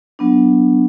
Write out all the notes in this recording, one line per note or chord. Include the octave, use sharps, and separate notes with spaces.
F#3 B3 D4